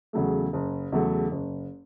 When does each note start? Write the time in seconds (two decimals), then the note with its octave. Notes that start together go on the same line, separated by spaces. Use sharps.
0.13 E2 C#3 F#3 A3
0.53 F#1
0.92 E2 C#3 F#3 A3
1.32 F#1